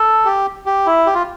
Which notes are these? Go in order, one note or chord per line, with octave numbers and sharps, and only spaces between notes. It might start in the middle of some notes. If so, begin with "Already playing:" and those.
Already playing: A4
G4
G4
E4
G4
F4